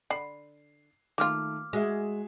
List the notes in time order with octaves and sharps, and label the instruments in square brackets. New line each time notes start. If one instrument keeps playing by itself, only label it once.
[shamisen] D3 B5 [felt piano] C7
[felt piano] D#3 A3 [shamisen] A#3 F4 [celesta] D6 F6
[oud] G#3 [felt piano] F#4 G#4 E5